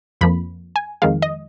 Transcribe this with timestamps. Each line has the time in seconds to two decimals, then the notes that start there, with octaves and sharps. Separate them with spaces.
0.21 F2 F3 A#3 B5
0.76 G#5
1.02 F2 D#3 G#3 F5
1.22 D#5